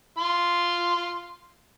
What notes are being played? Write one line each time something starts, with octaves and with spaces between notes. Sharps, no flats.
F4 C6